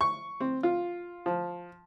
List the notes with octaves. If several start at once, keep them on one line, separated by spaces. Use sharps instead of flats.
C#6
C4
F4
F3